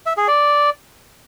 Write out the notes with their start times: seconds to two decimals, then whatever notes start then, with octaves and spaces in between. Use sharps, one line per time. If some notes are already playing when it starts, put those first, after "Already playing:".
0.06 E5
0.17 G#4
0.28 D5